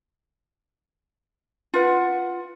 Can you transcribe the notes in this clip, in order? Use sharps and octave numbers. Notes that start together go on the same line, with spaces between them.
F4 B4 F#5